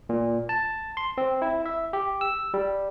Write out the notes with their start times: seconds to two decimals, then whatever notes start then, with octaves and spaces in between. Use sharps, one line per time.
0.09 A#2
0.49 A5
0.97 C6
1.18 C4
1.42 E4
1.66 E5
1.93 G4
2.21 E6
2.54 G3